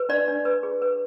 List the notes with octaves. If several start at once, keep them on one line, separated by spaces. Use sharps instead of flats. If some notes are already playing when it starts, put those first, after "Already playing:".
Already playing: B4
D4 D5
D4
B4
G#4
B4